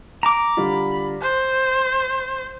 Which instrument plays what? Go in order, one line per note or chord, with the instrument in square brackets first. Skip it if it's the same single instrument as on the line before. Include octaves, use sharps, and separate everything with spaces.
[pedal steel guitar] A#5 D6
[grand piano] D3 G3 F4 [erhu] B5
[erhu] C5 [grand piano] F#6